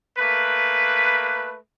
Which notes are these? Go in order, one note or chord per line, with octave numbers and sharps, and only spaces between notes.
A3 A#3 B4